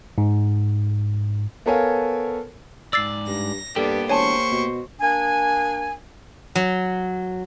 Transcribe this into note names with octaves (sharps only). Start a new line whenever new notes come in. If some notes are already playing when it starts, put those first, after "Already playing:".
G#2
B3 A4 A#4 C#5 F5 G#5
G#2 D5 E6 A6 C7
G2 A#6
G2 A#3 B3 D4 G4 A4
E1 C5 C#5 G#5 A5 C#6
B2
A#3 D4 G#5
F#3